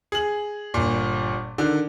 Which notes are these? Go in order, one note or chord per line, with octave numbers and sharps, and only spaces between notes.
G#4 F#7
G1 A#2
D3 D#3